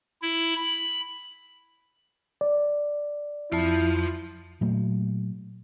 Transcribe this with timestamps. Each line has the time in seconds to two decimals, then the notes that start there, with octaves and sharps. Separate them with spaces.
0.22 E4
0.55 B5
2.41 D5
3.52 F2 E4 F4 A5
4.61 A#2 F#3 A3